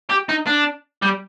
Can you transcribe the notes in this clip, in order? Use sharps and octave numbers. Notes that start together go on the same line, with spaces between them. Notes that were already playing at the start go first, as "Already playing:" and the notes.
G4
D#4
D4
G3